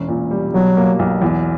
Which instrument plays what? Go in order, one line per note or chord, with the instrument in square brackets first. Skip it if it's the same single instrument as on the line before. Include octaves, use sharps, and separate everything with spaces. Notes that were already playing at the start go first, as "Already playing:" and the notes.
Already playing: [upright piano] E1 C#4
A#2
G3
[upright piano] B2 [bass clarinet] F#3
[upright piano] A#3
B1
E2